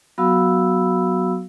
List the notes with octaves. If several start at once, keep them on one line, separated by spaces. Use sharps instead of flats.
F#3 B3 F#4 F5 B5 E6